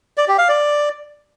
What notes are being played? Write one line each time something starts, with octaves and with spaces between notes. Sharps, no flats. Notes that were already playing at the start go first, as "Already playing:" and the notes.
D5
G4
F5
D5